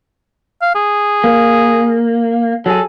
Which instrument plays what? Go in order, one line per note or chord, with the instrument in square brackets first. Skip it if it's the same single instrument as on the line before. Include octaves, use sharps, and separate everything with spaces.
[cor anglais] F5
G#4
[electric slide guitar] A#3
[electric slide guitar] F#3 G#4 [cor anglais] A4